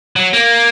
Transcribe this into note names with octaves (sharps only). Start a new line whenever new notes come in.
F#3
A#3